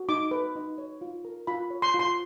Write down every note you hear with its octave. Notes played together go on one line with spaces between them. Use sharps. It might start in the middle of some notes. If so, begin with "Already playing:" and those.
Already playing: F#4
D#4 D6
B4
D#4
C#5
F4
A#4
F4 B5
C#5
C6
F4
C6